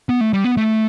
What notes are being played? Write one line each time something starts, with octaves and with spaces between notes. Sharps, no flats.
B3
A3
G3
B3
A3